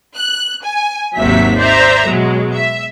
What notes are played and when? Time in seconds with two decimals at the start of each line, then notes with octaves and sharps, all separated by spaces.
0.16 F#6
0.64 G#5
1.16 G#1 D#2 C3 F#3 E5 B6
1.57 C5 D5 E5 A#5
2.06 B2 F#3 G#3
2.54 E5